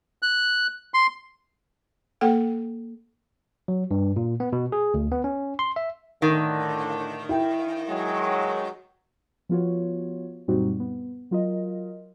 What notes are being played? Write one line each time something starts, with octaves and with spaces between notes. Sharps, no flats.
F#6
C6
A#3 A4 F#5 G5
F#3
G2
A#2
B3
B2
G#4
D2
B3
C#4
C6
E5
A2 D3 D#3
E4 G5
F#3 G#3
F3 B3 F4 F#4 C#5
F#2 A#2 G3 C4 D#4 F#4
B3
F#3 F4 A#4 D#5